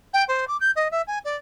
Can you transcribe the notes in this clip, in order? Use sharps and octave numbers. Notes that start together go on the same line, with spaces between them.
G5
C5
D6
G6
D#5
E5
G#5
D5